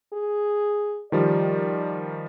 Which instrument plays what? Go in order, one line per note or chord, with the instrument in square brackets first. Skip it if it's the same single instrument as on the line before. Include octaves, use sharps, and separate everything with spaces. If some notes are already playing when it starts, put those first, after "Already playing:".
[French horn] G#4
[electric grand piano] D#3 F3 G3 [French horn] D5